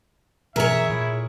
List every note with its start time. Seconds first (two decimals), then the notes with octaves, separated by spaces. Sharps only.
0.56 B2 E3 G#4 A#4 C#5 E5
0.90 A#2 E4